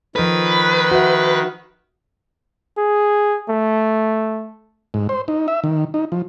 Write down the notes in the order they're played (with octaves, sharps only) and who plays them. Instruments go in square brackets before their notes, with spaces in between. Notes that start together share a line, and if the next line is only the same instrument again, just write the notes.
[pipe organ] D#3 [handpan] F3 A4 [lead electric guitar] B4
[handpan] F#4 E5
[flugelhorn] G#4
A3
[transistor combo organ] G#2
C5
D#4
E5
D#3
D#4
F3